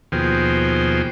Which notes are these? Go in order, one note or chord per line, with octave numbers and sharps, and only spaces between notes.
D#2 B2 F3 G#4 C5 G5